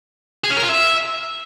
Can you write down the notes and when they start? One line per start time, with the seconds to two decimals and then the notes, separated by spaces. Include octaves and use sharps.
0.44 G#4
0.50 C#4
0.57 A#4
0.63 F4
0.69 E5